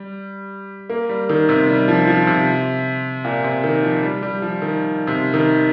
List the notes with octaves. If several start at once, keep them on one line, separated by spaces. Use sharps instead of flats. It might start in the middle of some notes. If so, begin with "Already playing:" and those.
Already playing: G3
A#3
G3
D#3
C3
G3
F3
F3
C3
A#2
C3
D#3
F3
G3
G3
F3
D#3
C3
D#3